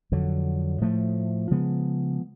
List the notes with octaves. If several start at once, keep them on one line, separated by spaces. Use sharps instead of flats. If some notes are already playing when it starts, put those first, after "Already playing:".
F2 D3 F#3
A2 F3 A3
C#3 F3 G#3 B3